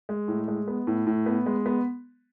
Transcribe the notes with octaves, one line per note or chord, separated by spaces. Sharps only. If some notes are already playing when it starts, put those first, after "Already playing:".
G#3
A2
G#3
B3
A2
A2
B3
G#3
B3